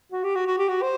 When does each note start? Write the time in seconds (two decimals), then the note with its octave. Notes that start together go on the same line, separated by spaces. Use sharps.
0.12 F#4
0.24 G4
0.35 F#4
0.46 F#4
0.58 G4
0.68 F#4
0.82 C5